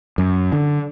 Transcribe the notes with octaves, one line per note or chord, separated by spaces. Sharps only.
F#2
D3